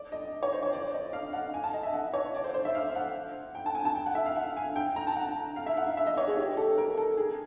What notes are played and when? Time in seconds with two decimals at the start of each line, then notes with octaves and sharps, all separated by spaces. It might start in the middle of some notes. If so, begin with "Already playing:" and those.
Already playing: D5
0.12 D#5
0.43 C#5
0.52 C5
0.63 C#5
0.73 D5
0.94 D#5
1.13 F5
1.33 F#5
1.54 G#5
1.64 A5
1.74 D#5
1.83 E5
1.94 F#5
2.13 C#5
2.34 D5
2.44 C5
2.54 C5
2.65 E5
2.75 F5
2.95 F#5
3.55 G5
3.66 A5
3.75 G#5
3.85 A5
3.95 G5
4.06 F#5
4.15 E5
4.26 F5
4.36 F#5
4.57 G#5
4.76 G5
4.96 A#5
5.07 A5
5.16 F#5
5.56 F5
5.66 E5
5.77 F#5
5.87 F5
5.97 E5
6.06 D#5
6.17 C#5
6.27 G#4
6.37 G4
6.57 A4
6.78 A#4
6.97 A4
7.17 G#4